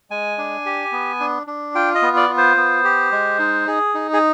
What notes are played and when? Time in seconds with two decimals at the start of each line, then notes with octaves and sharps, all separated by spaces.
0.10 G#3 G#5
0.38 D4
0.66 G4
0.92 B3
1.20 D4
1.47 D4
1.75 F4 G5
1.95 D#5
2.02 B3
2.17 D5
2.29 F4
2.37 C5
2.57 B3
2.84 G4
3.12 G#3
3.39 D#4
3.67 G#4
3.94 D#4
4.13 G#4